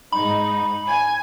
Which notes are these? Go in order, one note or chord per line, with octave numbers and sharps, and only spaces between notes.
G#2 D#4 B5
G#5